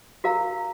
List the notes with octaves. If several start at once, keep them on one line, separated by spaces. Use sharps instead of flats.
F#4 A#4 F5 A#5